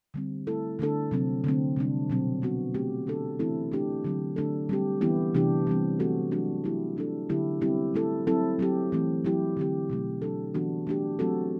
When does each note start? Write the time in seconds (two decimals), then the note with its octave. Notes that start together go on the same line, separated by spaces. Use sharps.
0.14 D3 G3 C4
0.47 A3 E4 A4
0.79 D3 A3 D4 A4
1.11 C3 F#3 C4
1.44 D3 A3 C4
1.77 C3 G3 D4
2.10 B2 F#3 C4
2.42 F#3 B3 F#4
2.74 A3 C4 G4
3.07 D3 A3 D4 A4
3.39 E3 A3 C4 E4 A4
3.72 A3 D4 G4
4.04 D3 F#3 C4
4.36 D3 A3 D4 A4
4.69 G3 C4 G4
5.01 E3 B3 E4 G4
5.35 C3 E3 A3 D4 G4
5.67 E3 G3 C4
5.99 F#3 A3 C4 F#4 A4
6.31 F#3 A3 D4 F#4
6.64 F#3 A3 E4 G4
6.97 A3 D4 A4
7.29 D3 F#3 B3 E4 G4
7.61 G3 C4 E4 G4
7.94 A3 E4 A4
8.27 F#3 C4 E4 A4
8.59 F#3 C4 G4
8.92 E3 A3 C4
9.25 F#3 A3 E4 G4
9.57 D3 F#3 C4 G4
9.90 B2 F#3 A3
10.22 F#3 A3 D4 A4
10.54 E3 G3 B3 D4 F#4
10.87 A3 D4 G4
11.19 F#3 A3 C4 F#4 A4